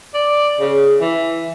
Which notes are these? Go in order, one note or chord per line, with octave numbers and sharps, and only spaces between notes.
D5
C#3
E3